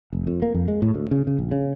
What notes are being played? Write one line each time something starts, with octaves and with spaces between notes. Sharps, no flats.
F1
F2
A#3
F2
G#3
A2
D2
C#3
C#3
A#1
C#3